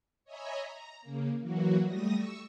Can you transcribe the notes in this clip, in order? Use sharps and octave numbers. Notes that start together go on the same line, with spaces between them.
C#5 D#5 E5 G#5 A#5 B5
A#5
C#3 A#3
E3 F#3 A#3 F#4
G3 A3 D#6 A#6
C#6 E6